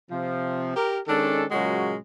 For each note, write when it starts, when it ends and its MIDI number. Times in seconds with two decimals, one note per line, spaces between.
0.10 0.73 48
0.10 0.73 53
0.76 0.99 67
0.76 0.99 70
1.08 1.45 51
1.08 1.45 56
1.08 1.45 61
1.08 1.45 62
1.08 1.45 69
1.51 1.96 46
1.51 1.96 49
1.51 1.96 54
1.51 1.96 56
1.51 1.96 61
1.51 1.96 66